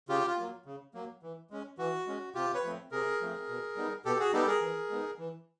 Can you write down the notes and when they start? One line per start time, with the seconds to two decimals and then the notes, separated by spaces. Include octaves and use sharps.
0.09 C#3 F4 G4
0.27 F4
0.37 F#3 A#3
0.66 C#3
0.94 F#3 A#3
1.23 E3
1.51 G#3 C#4
1.78 E3 F#4
2.07 G#3 C#4
2.35 C3 F4 G4
2.54 B4 C#5
2.64 F3 A3 C4
2.91 C3 G#4 A#4
3.21 F3 A3 C4
3.48 B2
3.77 G3 B3 D#4
4.05 B2 G4 A4
4.19 F#4 G#4
4.33 G3 B3 D#4 G4 A4
4.47 G#4 A#4
4.61 E3
4.90 G#3 B3 D#4
5.18 E3